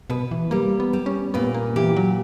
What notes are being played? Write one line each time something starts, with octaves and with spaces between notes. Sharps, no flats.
B2 B4
E3
G3 A#3
B3
G3
C#4
A#2 B3
A#3
E3 G4
F#3